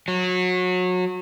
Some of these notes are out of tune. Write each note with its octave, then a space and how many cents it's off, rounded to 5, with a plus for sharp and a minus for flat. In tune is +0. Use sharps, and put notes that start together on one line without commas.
F#3 -25